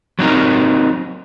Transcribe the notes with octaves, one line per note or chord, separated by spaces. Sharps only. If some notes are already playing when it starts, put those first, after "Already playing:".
F#3 C4 D#4 A#4